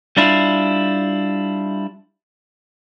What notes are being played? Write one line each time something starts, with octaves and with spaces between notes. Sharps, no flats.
G3 D4 E4 F4